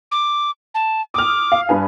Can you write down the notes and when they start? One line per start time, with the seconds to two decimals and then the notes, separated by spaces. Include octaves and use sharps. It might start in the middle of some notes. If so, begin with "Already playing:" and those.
0.12 D6
0.75 A5
1.14 D6 D#6 F6
1.52 F5
1.69 G2 B4 G#5